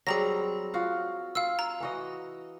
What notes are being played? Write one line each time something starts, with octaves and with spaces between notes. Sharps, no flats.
F#3 G3 C4 G#4 A#5 A#6
F4 F#4
F4 F5 E6
A#5
E3 F#4 D#5